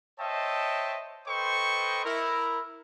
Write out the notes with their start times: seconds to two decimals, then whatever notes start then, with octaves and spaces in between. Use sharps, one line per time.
0.19 C5 C#5 D#5 E5 G5 A5
1.27 A4 B4 C5 D#5 G5 C#6
2.05 E4 A#4